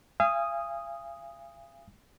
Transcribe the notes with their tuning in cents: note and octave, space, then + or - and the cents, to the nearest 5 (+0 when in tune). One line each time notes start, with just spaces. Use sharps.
F5 -40 G#5 -25 D#6 +0